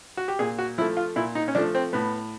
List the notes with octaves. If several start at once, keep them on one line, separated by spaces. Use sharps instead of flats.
F#4
G4
A#2 G#4
F#4
F3 A3 E4
F4
A#2 E4
D#4
C#4
F3 A3 D4
C4
A2 B3